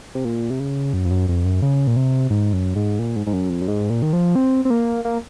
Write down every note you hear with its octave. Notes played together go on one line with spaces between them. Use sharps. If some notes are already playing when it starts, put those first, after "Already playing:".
C3
A#2
C3
C#3
F#2
F2
F#2
F2
F#2
C#3
A#2
C3
G#2
F#2
G#2
A#2
G#2
G#2
F#2
F2
F#2
G#2
A#2
D#3
F3
C4
C4
A#3
A#3